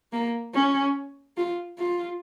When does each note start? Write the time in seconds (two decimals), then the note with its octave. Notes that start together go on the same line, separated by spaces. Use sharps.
0.13 A#3
0.55 C#4
1.37 F4
1.78 F4